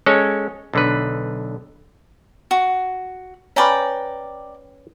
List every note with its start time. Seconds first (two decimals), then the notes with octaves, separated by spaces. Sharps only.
0.06 G#3 C#4 A4 C#5
0.73 B1 D3 B4
2.51 F#4
3.56 C#4 B4 D5 G5 A#5